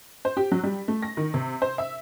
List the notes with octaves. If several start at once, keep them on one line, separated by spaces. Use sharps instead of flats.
C5
G4
F#3
G3
A3
A#6
D#3
C3
C5
E5